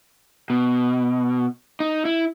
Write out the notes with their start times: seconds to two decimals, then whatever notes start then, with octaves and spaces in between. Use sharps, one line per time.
0.50 B2
1.80 D#4
2.05 E4